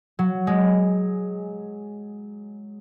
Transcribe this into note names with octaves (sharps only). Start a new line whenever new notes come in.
F#3
G#3